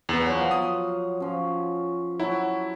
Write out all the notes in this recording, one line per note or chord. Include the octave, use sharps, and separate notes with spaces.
E2 B3
F3 F#3
D#6
F3 C#4
F#3 E4 A5 B5